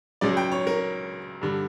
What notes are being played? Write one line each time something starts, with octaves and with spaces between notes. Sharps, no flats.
C#2 C#3 F#3 D5
G5
C#5
A#4
G2 D3 G3